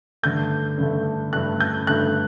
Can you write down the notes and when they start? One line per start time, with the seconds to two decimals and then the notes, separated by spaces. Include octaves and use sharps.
0.23 G2 D3 A3 G6
0.78 G2 D3 A3
1.33 G2 D3 A3 F#6
1.60 G6
1.87 G2 D3 A3 F#6